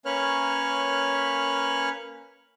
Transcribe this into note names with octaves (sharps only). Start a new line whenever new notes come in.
A#3 C#4 B4 C#5 F6 F#6